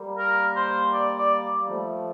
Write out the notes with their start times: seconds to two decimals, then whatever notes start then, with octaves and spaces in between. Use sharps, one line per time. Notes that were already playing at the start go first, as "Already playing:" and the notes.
Already playing: G3 A#3
0.18 A#4
0.56 C5
0.93 D5
1.18 D5
1.56 A#3
1.68 F3 A3